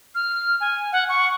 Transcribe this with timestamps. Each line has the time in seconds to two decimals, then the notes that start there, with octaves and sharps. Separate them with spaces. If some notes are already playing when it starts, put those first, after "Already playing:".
0.15 F6
0.60 G#5
0.93 F#5
1.09 C#6